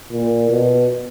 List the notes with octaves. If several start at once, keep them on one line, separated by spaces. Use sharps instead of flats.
A#2
B2